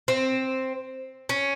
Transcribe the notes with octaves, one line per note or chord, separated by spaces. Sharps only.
C4
C#4